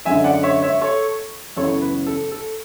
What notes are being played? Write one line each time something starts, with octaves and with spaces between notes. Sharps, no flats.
F#2 D3 G#3 E5 G#5
D5 F#5
C#5 E5
C#5 E5
A4 C#5
F#2 C#3 E3 B3 A4 C#5
B4
A4
A4